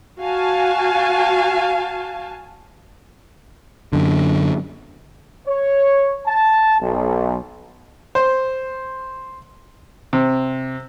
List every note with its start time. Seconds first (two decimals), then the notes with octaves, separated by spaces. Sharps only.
0.21 F#4 F5 G#5 A5
3.93 F#2 D3
5.48 C#5
6.27 A5
6.82 B1
8.15 C5
10.13 C3